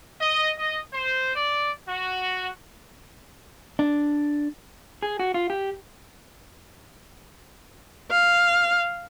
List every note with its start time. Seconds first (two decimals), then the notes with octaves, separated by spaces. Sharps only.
0.21 D#5
0.59 D#5
0.94 C5
1.36 D5
1.89 F#4
3.79 D4
5.02 G#4
5.20 F#4
5.34 F4
5.50 G4
8.11 F5